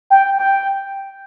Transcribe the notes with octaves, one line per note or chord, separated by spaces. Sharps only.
G5
G5